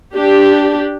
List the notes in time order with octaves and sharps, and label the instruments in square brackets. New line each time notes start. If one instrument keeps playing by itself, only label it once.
[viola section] D4 G4